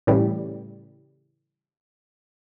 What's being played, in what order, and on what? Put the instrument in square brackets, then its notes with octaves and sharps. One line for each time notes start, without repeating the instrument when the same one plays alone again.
[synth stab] A2 C#3 E3 G3